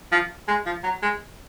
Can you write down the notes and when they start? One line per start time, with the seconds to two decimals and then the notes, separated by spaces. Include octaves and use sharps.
0.12 F3
0.48 G#3
0.66 F3
0.83 F#3
1.02 G#3